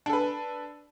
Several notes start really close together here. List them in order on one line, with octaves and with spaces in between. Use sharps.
D4 A4 B4